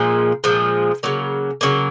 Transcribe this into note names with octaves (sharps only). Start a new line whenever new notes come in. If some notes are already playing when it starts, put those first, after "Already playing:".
Already playing: A#2 F3 G#3
A#2 F3 G#3
C#3 F#3 A#3
C#3 F#3 A#3